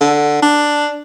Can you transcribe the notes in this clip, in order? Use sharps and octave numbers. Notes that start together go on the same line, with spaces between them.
D3
D4